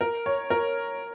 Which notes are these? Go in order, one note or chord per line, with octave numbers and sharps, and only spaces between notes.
A#4
C#5
A#4